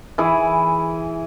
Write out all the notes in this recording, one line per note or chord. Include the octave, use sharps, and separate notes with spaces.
E3 E4 G#4